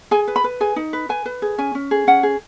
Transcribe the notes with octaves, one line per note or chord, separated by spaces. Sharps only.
G#4 G#5
B4
B5
B4
G#4 G#5
D#4
B4
B4 G#5
B4
G#4
C#4 G#5
C#4
G#4
C#4 F#5
G#4